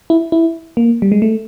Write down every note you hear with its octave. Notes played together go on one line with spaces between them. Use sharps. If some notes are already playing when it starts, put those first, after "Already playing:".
E4
E4
A#3
G3
G#3
A3